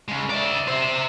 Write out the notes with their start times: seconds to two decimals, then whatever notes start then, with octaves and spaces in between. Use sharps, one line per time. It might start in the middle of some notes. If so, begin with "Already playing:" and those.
0.08 C#3 G#3
0.30 D5 E5
0.68 C5 E5